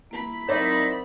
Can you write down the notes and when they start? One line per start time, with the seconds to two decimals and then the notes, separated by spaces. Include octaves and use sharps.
0.11 A#3 E4 B5
0.49 F#3 C4 D#4 A#4 C5 D5 E5